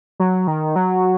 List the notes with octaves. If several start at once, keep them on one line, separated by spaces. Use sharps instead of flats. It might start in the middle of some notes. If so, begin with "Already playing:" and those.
F#3
D#3
F#3